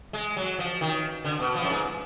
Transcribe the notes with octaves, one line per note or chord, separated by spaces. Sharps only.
G#3
F#3
F3
D#3
D3
B2
F3
F#2
G#2